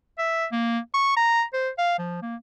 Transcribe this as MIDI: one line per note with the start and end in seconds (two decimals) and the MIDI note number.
0.18 0.46 76
0.52 0.79 58
0.94 1.14 85
1.16 1.44 82
1.54 1.70 72
1.78 1.98 77
1.98 2.22 53
2.22 2.36 58